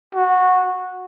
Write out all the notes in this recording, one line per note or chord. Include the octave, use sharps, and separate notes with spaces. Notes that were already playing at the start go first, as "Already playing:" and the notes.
F#4